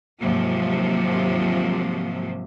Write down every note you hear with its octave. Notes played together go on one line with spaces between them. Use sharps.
D#2 G#2 C3 F3 F#3